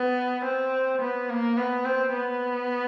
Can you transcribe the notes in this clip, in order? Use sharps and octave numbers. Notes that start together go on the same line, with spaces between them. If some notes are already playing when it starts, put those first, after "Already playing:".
Already playing: B3
C4
B3
A#3
B3
C4
B3